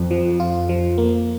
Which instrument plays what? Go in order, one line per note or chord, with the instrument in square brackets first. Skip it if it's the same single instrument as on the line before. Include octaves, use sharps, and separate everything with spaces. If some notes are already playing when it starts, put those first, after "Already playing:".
Already playing: [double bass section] F2
[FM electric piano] F3
F4
F3
A#3